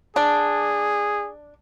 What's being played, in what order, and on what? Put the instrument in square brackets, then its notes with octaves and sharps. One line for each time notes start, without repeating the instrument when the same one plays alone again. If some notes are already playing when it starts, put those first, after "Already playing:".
[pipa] D4 [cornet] G#4